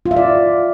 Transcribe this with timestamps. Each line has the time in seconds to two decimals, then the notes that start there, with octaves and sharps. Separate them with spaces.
0.06 F4
0.11 E5
0.17 D5